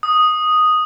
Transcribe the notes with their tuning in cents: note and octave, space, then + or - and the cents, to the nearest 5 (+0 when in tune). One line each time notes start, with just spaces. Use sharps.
D#6 -5